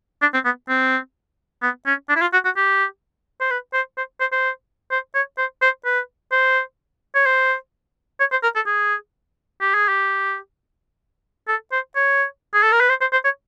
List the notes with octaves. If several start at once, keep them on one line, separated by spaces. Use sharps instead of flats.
D4
C4
B3
C4
B3
C#4
D4
E4
F4
F#4
F#4
G4
C5
B4
C5
C5
C5
C5
C5
C#5
C5
C5
B4
C5
C#5
C5
C#5
C5
A#4
A4
G#4
G4
G#4
G4
A4
C5
C#5
G#4
A4
A#4
B4
C5
C5
C5
C#5